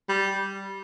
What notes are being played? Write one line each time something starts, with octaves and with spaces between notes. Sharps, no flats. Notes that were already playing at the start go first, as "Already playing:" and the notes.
G3